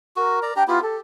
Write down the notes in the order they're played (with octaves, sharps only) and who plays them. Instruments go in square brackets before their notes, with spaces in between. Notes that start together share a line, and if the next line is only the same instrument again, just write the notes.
[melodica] F#4 [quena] A#4
[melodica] D5 A#5
[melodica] D4 G4 A#5 [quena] G5
[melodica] B3 E4 G4 [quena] F4
[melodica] G4 [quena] A4